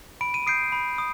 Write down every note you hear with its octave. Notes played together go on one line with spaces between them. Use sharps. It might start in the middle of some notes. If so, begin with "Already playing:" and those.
B5 D7
D#7
D#6 G6 C7 D7
B5
D#6